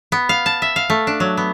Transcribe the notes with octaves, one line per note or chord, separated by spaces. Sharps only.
B3
F5
A5
E5
F5
A3
D4
F#3
B3